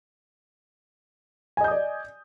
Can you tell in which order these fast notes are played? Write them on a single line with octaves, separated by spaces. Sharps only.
G#5 D#5 G6 D#6 D5